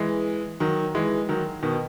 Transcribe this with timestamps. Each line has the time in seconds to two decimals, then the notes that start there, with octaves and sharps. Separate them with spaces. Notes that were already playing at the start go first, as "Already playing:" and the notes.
Already playing: E3 G#3
0.60 D#3 F#3
0.95 E3 G#3
1.29 D#3 F#3
1.63 B2 D#3